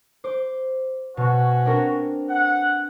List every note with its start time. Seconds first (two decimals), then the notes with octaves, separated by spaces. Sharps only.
0.24 C5 D6
1.17 B2 C#4 F#4
1.65 C4 D4 A#4
2.30 F#5